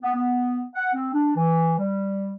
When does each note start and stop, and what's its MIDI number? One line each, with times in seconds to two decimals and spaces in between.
0.02 0.10 59
0.14 0.61 59
0.75 0.93 78
0.93 1.09 60
1.13 1.31 62
1.36 1.75 52
1.78 2.35 55